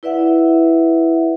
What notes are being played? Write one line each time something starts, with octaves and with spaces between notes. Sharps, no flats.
E4 B4 D5 E5 F#5